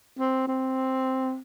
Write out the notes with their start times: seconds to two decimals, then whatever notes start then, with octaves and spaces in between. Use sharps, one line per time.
0.19 C4
0.48 C4